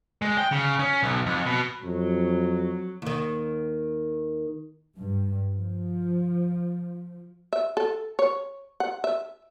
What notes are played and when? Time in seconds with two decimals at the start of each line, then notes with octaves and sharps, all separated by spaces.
0.22 G#3
0.38 G5
0.52 C#3
0.79 C#4
1.03 B1
1.26 F2
1.46 B2
1.83 F2 F#3
3.02 D#2 D#3
4.98 G2
5.54 F3
7.53 E5
7.77 A4
8.19 C#5
8.80 F#5
9.04 E5